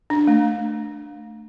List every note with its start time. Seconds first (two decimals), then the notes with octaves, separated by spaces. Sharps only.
0.10 D4
0.27 A3